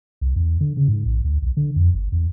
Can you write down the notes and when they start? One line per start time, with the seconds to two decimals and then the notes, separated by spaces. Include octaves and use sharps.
0.21 C2
0.36 E2
0.61 D3
0.77 C#3
0.88 G#2
1.06 A#1
1.25 D2
1.42 B1
1.57 D3
1.76 F2
1.94 G1
2.12 E2